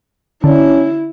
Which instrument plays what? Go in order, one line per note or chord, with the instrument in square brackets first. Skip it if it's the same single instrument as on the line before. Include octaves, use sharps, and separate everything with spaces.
[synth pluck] D3 [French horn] C#4 [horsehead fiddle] E4